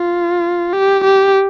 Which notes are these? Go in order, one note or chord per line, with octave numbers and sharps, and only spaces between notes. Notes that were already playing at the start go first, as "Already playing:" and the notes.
Already playing: F4
G4
G4